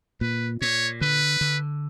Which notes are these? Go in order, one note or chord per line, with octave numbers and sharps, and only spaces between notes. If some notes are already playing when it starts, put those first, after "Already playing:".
A#2 B4
A#2 C#5
D3 B4
D3